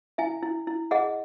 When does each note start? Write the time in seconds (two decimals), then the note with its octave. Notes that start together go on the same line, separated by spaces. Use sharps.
0.18 E4 E5 G#5
0.43 E4
0.67 E4
0.91 G#4 D#5 F#5